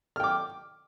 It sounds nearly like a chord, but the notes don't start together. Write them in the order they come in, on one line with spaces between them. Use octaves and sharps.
F6 G5 D6